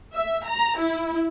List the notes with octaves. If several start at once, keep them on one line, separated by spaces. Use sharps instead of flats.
E5
A#5
E4